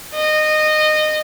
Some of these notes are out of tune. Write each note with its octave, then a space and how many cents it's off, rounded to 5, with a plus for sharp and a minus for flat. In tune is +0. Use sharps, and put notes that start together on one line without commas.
D#5 -20